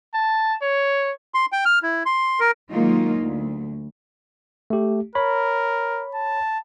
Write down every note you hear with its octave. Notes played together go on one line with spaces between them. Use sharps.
A5
C#5
C6
G5
F6
E4
C6
A#4
D#3 F#3 G#3 A#3 D#4 F4
D2
A3 G4
A#4 C#5 B5
A5